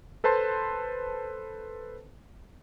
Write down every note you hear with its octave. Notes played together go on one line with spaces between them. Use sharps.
A4 B4 C5 A5 C6